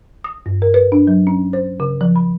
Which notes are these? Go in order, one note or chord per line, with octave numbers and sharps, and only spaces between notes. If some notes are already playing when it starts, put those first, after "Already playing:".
D#6
G2
A#4
B4
D4
F#3
C#4
C5
C#3
F3
B5